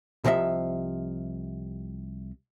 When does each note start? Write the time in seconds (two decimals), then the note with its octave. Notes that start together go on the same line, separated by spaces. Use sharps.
0.25 C2 C3 F3 D#5 E5